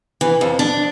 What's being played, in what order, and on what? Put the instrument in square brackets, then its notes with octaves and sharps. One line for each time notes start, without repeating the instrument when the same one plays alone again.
[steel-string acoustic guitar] E3
F2
D4